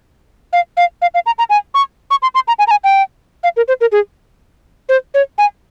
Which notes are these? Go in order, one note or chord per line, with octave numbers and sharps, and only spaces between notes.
F5
F5
F5
F5
A#5
A#5
G#5
C#6
C#6
C6
C6
A#5
G#5
A#5
G#5
G5
F5
A#4
C5
A#4
G#4
C5
C#5
G#5